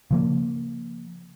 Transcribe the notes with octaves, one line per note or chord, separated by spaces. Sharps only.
C#3 F3 A#3